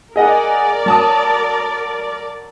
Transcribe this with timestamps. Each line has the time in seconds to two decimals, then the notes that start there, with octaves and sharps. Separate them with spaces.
0.16 G#4 A#4 D5 D#5 F#5
0.86 F#3 A5 D#6